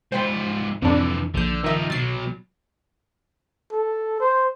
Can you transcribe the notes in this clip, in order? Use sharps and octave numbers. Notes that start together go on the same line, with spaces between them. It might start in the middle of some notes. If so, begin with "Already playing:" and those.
G#2 F4 C5 G5 B5
F2 A2 D3 E3 D4
A#1 D3 G6
D#3 F3 D#4 E5
B2 F#3 A6 C7
A4
C5